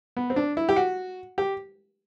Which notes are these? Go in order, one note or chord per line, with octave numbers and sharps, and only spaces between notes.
B3
C4
D4
E4
G4
F#4
G4